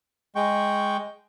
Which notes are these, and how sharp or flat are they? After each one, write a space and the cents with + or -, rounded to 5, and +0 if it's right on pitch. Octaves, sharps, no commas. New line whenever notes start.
G#3 +0 G5 +0 C#6 +0